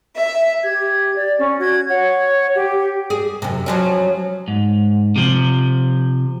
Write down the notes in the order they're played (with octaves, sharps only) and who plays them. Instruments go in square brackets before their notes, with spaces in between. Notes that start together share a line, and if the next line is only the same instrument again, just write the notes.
[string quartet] E5
[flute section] G4 G#6
D5
C#4
F#4 G#6
C#5 F#5
G4
[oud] G#4
F#2 C3
F3 F#3 C#4
[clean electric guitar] G#2
C3 F3